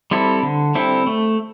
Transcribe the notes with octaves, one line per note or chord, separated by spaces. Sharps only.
G3 C4 E4 A4
D3
G3 C4 E4 A4
A3